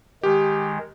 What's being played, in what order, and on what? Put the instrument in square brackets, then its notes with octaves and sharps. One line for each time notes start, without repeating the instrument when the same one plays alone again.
[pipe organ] D#3 G#3 [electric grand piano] G4